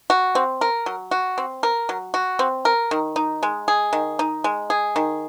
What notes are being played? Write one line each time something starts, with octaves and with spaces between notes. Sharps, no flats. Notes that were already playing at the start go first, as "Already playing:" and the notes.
F#4
C4
A#4
F#3
F#4
C4
A#4
F#3
F#4
C4
A#4
D#3
D#4
G#3
G#4
D#3
D#4
G#3
G#4
D#3